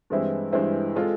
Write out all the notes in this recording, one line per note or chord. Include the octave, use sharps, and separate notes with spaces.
G2 E3 G#3 C4 E4
G2 E3 G#3 C4 E4
G#3 C4 F4 A4